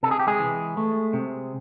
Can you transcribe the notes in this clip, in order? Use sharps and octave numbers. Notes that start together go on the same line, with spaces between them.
C3 A4
G#4
G4
G#3 G#4
E3
A3
C3